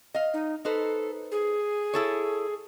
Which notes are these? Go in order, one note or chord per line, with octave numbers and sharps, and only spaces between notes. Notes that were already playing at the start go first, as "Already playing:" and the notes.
D#5 F5
D#4
D#4 A4 B4 C5
G#4
E4 A4 C#5